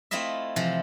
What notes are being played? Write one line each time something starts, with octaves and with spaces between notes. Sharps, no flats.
A3 C4 E4 F4 D#5 E5
C3 E3 F3